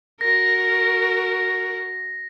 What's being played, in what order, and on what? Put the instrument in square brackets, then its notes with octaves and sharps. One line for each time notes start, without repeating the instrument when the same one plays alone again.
[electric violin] F#4 A#4 [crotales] A#6